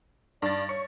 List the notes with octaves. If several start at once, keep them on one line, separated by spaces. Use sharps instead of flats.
G2 D5 A6
C#5 C#6 C#7